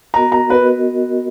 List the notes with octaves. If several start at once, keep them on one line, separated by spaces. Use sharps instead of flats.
B3 F#4 A#4 D#5 A#5
A#5
B3 F#4 A#4 B4 D#5